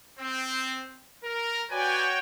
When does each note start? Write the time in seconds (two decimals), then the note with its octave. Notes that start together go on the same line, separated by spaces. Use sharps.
0.19 C4
1.24 A#4
1.71 F#4 B4 C#5 D5 G5 G#5